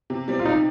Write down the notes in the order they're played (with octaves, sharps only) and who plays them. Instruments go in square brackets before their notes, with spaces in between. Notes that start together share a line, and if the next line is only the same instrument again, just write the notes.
[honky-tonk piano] C3
G3 C4
[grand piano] F4
[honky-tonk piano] C3 [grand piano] D#4